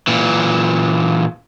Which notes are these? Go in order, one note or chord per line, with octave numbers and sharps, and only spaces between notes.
A#2 E3